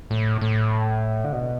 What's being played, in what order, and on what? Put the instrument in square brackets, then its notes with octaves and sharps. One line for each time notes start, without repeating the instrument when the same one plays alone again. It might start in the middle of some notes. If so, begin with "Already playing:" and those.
[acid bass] A2
A2
D3
B2